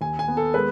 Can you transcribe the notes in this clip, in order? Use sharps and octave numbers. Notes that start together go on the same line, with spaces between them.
D#2 G#5
G#5
B3
A4
G#3 B4